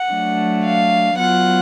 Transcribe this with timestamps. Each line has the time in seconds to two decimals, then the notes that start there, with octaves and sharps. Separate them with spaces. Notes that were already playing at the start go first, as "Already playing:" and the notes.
Already playing: F#5
0.11 F#3 A3 D4
0.65 F5
1.17 F#3 B3 F4 F#5